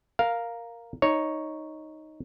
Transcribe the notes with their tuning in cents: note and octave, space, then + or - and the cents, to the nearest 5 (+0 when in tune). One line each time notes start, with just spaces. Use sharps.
A#4 +0 F5 +0
D#4 +0 C#5 +0